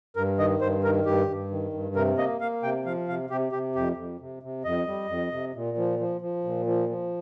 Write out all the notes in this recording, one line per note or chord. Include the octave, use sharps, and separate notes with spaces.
G2 A#4
D#3 D#5
G2 C5
D#3 A#4
G2 G4
G2
D#3
G2
C3 A#4
A#3 D#5
A#3 F5
C3 G5
F3 F5
C3 F5
C3 G4
C3 G4
F2 G4
F2
C3
C3
F2 D#5
G3
F2
C3
A#2
F3
F3
F3
A#2
F3
F3